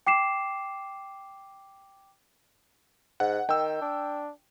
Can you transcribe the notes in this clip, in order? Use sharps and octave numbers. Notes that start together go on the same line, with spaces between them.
G5 D6 C7 E7
G#2 F#5
D#3 G5 E6
D4